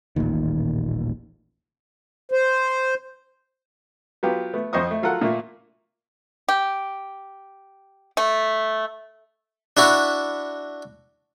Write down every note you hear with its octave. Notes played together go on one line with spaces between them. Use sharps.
D#1 A1 A#2 D#3
C5
F#3 B3 F4 G4
A3 B3
F2 C5 D#5 C#6 D#6
A3
F#3 F4 A4 A#4 F#5
A#2 A3 A#3
G4
A3
D4 E4 F#4